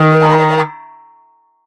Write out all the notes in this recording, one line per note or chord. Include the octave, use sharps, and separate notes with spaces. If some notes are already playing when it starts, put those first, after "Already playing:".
Already playing: D#3